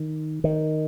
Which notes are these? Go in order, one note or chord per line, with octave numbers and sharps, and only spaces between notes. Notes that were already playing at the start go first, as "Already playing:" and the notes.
Already playing: D#3
D#3